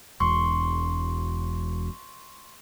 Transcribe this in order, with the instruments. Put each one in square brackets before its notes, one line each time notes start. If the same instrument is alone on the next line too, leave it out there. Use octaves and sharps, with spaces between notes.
[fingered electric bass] E1 E2 [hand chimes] C6 C#6